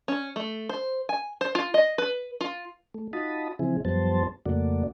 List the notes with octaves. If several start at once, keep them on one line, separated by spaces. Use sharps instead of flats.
C#4
A3
C5
G#5
C5
F4
D#5
B4
F4
A3
D#4 F4 F#4 A5 B5 D#6
C#3 E3 F3 C4 E4 G#4
F#2 F3 G3 B3 C5 A5
F2 C#3 A3 A#3 F#4 D5